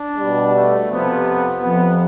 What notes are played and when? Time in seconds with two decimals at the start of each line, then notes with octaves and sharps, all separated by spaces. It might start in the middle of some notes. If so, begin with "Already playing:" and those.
Already playing: D4
0.17 B2 G3
0.52 A3
0.88 F2 C3 F3 B3
1.60 F2 C3 F3 B3